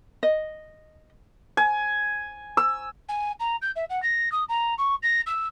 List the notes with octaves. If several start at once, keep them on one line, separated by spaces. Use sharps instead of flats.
D#5
G#5
E6
G#5
A#5
G6
E5
F#5
A#6
D#6
A#5
C#6
A#6
E6